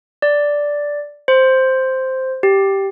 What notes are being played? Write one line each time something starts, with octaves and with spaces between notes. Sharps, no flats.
D5
C5
G4